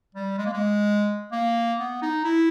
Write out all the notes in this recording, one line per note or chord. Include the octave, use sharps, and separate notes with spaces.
G3
G#3
A#3
G#3
A#3
B3
D#4
E4